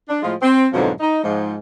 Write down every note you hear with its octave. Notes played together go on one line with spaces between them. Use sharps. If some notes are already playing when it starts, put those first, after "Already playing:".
D4
A2 F3 G#3 F4
C4
F2 G#2 B2 D3 F3 F#3
D#4
G#2 F3 G#3